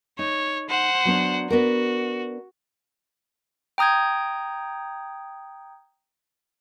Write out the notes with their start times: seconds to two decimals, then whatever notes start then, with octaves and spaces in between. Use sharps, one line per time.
0.19 D#4 C#5
0.70 C5 F#5
1.05 F#3 B3 D4
1.50 B3 D4 F#4 A#4
3.78 G5 A#5 D#6 G6 G#6